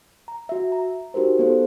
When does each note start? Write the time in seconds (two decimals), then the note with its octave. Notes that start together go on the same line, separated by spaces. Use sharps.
0.28 A#5
0.49 F#4 E5
0.72 A#5
1.14 D#4 F#4 G4 A#4 C5
1.39 B3 A4 C5